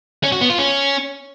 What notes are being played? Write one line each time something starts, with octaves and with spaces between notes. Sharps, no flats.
C#4
F#4
B3
F4
C#4